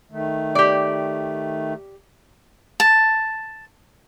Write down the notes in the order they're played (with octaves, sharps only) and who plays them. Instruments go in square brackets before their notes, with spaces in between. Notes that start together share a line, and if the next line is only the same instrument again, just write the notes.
[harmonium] D#3 A3
[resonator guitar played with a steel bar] G4 D5
[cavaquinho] A5